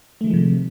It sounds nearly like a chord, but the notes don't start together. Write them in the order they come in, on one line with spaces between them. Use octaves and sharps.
A3 D#3 G#3 F3 C3